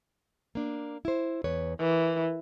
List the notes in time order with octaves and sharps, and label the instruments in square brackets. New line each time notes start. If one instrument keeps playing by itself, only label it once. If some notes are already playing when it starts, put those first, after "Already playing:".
[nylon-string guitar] A#3 D4
E4 C5
E2 B4 C#5
[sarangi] E3 [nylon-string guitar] A#4